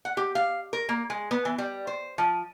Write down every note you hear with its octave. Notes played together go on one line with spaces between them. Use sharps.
F#5
G4
F5
A#4
A#3
G#3
B3
E3
G3
C5
F3